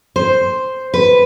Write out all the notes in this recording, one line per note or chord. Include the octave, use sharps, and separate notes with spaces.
C5
B4